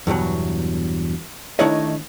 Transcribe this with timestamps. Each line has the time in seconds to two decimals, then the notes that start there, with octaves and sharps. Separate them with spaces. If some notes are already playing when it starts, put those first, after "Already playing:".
0.07 E2 G2 B2 F#3
1.59 D#3 A3 D4 E4 C#5 D#5